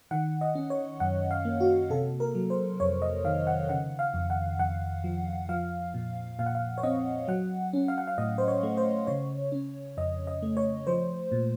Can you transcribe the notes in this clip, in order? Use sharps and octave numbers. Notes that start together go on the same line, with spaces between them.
D#3 F#5
D#5
C#4
C#5
F#2 F#5
F5
A#3
F#4
C3 A4
A#4
F#3
C5
F2 C#5
D#5
D#3 F5
F#5
C#3 F#5
F5
F2
F#5
F2 F#5
F3
F3 F5
A#2
A#2 F5
F#5
F5
C#5
C4 D#5
F#3 F#5
C#4
F5
F#5
F5
A2 D#5
C5
C#5
A3
C5
C#3 C#5
C#4
F2 D#5
D#5
A3
C#5
F3 C5
A#2